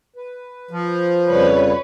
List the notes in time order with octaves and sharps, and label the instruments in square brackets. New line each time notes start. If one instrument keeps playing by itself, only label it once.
[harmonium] B4
[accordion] F3
[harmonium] F2 C#3 G3 [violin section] B4 C#5